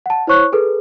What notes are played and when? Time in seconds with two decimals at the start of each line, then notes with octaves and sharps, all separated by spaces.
0.06 F#5 A5
0.27 E4 C5 C#5 C#6 F#6
0.52 G#4 A4 B4